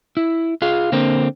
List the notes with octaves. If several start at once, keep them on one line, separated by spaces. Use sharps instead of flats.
E4
F4 G#4 F5
D3 A#3 C4